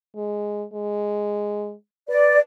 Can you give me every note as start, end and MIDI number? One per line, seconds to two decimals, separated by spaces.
0.16 0.64 56
0.74 1.73 56
2.09 2.38 71
2.09 2.38 74